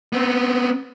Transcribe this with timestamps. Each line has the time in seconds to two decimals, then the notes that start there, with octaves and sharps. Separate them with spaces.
0.13 B3 C4